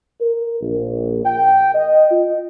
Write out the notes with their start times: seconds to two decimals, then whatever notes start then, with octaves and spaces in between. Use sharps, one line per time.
0.20 A#4
0.61 A#1
1.24 G5
1.74 D#5
2.10 F4